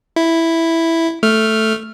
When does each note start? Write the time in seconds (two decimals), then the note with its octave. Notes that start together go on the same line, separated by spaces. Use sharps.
0.16 E4
1.23 A3 F6